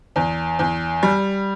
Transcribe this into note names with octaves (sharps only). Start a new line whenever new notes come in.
E2
E2
G3